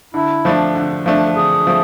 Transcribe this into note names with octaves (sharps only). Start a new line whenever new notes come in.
D3 E4
F3 A3 D4
D3
F3 A3 D4
D3 G#4
F3 A3